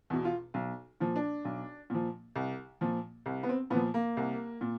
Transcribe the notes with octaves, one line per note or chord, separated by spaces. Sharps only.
E2 B2
F4
B1
A#2 F3
D4
B1
A#2 F3
C2
A#2 F3
C2
B3
C4
A#2 F3 B3
A#3
C2
A#2